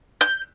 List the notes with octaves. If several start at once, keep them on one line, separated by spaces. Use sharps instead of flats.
G6